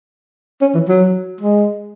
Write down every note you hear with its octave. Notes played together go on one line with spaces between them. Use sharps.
C#4
E3
F#3
G#3